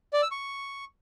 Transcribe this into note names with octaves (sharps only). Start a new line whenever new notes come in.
D5
E6
C#6